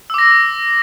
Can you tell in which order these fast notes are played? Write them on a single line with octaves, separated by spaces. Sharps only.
E6 D6 A#6